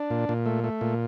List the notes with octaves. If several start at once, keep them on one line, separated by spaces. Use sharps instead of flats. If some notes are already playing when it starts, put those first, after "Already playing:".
Already playing: D4
A#2
A#2
A3
A3
A#2